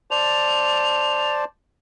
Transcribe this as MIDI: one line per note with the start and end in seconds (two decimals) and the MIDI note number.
0.11 1.44 72
0.11 1.44 74
0.11 1.44 81
0.11 1.33 101